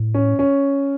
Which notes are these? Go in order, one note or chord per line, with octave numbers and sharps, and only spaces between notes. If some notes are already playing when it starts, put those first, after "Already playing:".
Already playing: A2
C#4
C#4